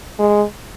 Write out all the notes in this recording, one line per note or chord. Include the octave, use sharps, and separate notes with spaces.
G#3